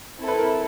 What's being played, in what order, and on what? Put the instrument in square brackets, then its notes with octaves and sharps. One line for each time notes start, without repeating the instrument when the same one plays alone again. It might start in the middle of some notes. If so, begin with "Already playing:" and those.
[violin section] C4 E4 A4
[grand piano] B4
A#4